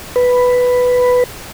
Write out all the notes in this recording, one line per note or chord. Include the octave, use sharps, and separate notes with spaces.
B4